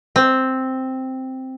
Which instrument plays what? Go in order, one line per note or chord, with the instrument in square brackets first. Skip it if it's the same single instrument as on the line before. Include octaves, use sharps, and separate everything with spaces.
[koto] C4